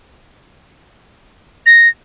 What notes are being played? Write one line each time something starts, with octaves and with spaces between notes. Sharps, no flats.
A#6